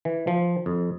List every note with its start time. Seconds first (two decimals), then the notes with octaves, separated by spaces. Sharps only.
0.05 E3
0.27 F3
0.66 F2